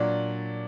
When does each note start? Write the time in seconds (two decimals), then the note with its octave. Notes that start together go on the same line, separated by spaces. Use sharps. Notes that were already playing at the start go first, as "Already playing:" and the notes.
Already playing: A#2 F#3 D4 D5